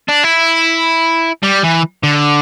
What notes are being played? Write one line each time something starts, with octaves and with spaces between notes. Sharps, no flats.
D4
E4
G3
E3
D3